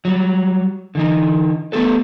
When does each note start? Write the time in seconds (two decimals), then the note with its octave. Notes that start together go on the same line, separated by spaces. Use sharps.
0.05 F#3 G3
0.95 D3 E3 D#4
1.72 A3 B3 G4 A4 B4